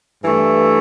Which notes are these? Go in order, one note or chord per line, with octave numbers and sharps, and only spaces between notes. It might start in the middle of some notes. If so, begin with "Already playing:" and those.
G2 E3 A3